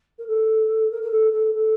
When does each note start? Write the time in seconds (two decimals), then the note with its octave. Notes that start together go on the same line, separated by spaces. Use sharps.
0.18 A#4
0.27 A4
0.91 A#4
1.02 A#4
1.10 A4
1.32 A4
1.53 A4